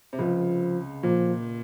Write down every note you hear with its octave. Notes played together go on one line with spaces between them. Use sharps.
C3
C#2 C#3 F3
A#2 F3